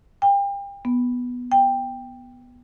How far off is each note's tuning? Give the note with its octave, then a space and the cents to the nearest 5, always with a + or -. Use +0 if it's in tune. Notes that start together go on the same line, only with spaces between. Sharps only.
G5 +35
B3 -5
G5 +10